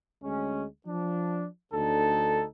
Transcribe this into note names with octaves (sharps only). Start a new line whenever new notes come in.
D2 G#3 C#4
F3 D4
D2 D3 D#4 A4